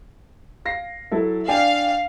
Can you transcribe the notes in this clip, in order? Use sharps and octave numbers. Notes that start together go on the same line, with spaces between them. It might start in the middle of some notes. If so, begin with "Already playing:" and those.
F5 A#6 C7
F#3 E4 A4
D4 F5 G5 G#5